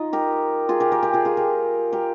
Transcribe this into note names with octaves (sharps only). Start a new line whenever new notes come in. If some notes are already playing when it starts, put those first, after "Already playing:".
Already playing: D#4 F4
G4 A#4
F4 G#4
G4 A#4
G4 A#4
G4 A#4
F4 G#4
F4 G#4
G4 A#4
G4 A#4